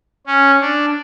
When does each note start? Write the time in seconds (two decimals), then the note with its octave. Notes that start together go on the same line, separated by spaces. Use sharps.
0.27 C#4
0.61 D4